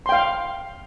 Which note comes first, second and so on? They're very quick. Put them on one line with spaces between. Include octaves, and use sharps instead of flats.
C6 G5 F5